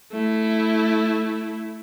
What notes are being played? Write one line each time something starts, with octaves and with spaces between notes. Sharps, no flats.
A3 E4